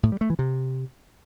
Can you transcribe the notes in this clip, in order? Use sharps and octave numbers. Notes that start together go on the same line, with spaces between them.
A2
G3
A3
E3
C3